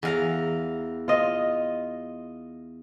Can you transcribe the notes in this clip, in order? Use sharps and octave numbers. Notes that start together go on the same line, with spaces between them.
E2 F5 A#5
F4 D#5